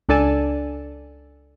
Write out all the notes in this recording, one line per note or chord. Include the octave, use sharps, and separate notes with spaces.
C#2 D4 A4 D5 G#5 A5